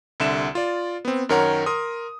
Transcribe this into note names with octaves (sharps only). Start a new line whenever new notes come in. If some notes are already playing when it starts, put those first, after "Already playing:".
C2 D3 E5 E7
F4 D5
B3 C4
F#2 D#3 A#4 C#5 F#5 A#5
A#4 C6 D#6